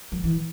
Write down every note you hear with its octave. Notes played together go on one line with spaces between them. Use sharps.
F#3
E3